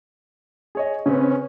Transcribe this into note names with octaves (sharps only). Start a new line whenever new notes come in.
G#4 C#5 D#5
C#3 C4 C#4 B4